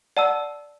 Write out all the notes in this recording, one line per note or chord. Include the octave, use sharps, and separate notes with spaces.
D5 F#5 A5 E6